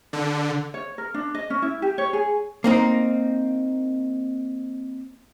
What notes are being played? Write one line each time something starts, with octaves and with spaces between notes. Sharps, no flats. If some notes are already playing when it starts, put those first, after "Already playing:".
D3
C#5
A#4
D4
D#5
C#4
E4
G4
C#5
G#4
A#3 C4 D#4